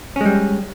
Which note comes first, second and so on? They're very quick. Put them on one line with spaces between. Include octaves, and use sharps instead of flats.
C#4 G#3 G3